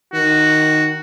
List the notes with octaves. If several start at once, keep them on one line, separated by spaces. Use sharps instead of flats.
D#3 F#4